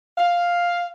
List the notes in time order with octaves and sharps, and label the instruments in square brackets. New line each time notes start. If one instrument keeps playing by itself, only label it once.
[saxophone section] F5